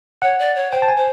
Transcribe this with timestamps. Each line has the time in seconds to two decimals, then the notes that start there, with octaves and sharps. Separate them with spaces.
0.22 C#5 F#5
0.39 D5
0.55 C#5
0.72 C5 G5
0.82 A5
0.88 G#5
0.96 C5